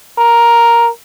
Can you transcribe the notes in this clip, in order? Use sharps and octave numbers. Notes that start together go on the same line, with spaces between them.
A#4